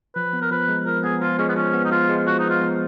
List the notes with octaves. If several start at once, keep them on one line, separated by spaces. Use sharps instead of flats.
F3 B4
B3
A#4
F3 B4
G#3
F3 A#4
B3 G#4
F3 F4
G#3 C#4
B3
F3 C#4
B3
D#4
F3 F4
G#3
F3 F#4
B3 D#4
F4
F3